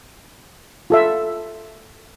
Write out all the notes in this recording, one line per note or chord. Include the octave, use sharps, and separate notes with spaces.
F4 A4 E5